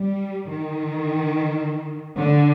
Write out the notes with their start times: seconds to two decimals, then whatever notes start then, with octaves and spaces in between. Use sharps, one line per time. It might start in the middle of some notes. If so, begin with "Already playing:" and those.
Already playing: G3
0.49 D#3
2.18 D3